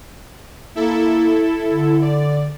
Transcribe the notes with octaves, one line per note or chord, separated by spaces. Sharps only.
A#3 E4 A4
D3
D5